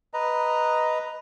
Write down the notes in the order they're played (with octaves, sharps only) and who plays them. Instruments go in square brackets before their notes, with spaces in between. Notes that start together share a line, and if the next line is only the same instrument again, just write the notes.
[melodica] B4 D#5 A#5